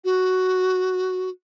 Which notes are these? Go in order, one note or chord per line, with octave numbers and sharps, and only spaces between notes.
F#4